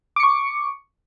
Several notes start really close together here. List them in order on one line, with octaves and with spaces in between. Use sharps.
D6 C#7 C#6